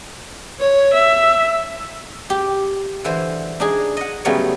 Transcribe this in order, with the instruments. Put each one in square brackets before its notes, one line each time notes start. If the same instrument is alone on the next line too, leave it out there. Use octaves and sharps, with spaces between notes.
[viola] C#5
E5
[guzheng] G4
D3 E3 C5
D4 D#4 G#4
D#5 F#5
C#3 F#3 G3 A3 B3 C#4